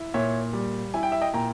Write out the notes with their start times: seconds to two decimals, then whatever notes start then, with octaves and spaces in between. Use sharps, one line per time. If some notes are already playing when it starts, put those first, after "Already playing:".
Already playing: E4
0.14 A#2 C#5 E5
0.53 G3
0.94 E4 G#5
1.03 G5
1.12 E5
1.21 D#5 G5
1.34 A#2 G5 A#5